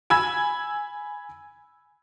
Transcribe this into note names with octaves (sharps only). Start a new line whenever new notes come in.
G#5 B5 E6 G#6